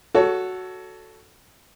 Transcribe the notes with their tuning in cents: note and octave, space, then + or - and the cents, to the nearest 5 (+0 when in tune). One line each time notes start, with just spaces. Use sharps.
F#4 +0 A4 +0 C#5 +25